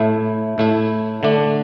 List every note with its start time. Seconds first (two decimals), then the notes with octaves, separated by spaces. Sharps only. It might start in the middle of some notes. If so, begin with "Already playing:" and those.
Already playing: A2 A3 E4
0.58 A2 A3 E4
1.23 D3 A3 D4